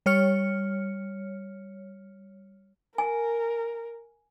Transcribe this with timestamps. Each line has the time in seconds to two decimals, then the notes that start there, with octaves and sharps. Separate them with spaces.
0.06 G3 C#5 F6 C#7
2.98 A#4 G#5